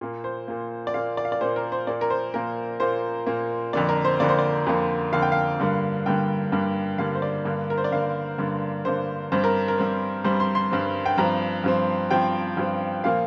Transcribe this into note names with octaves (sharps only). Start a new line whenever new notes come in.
A#2 A#3
C5
A#2 A#3
D5
A#2 A#3 F5
D5
F5
D5
A#2 A#3 C5
A#4
C5
A#2 A#3 D5
A#4
C5
A#2 A#3 A#4
A#2 A#3 C5
A#2 A#3
F2 D3 A#3 D5
A#4
C5
F2 D3 A#3 D5
C5
D5
F2 D3 A#3
F2 D3 A#3 F5
G5
F5
G2 D3 G3 A#3
G2 D3 G3 A#3 G5
G2 D3 G3 A#3
G2 D3 G3 A#3 F5
C5
D5
G2 D3 A#3
A#4
C5
D5
G2 D3 A#3 F5
G2 D3 A#3
G2 D3 A#3 C5
G2 G3 C4 C5
A#4
A#4
G2 G3 C4
G2 G3 C4 C5
C6
C6
G2 G3 C4
G5
G2 F3 C4 A#5
G2 F3 C4
G2 F3 C4 G5
G2 F3 C4
A#2 F3 A#3 F5